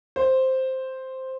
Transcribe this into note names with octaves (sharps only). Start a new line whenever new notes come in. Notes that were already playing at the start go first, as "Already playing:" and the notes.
C5